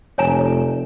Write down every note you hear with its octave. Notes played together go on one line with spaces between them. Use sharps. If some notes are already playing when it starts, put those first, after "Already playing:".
F1 C#5 G#5 A#5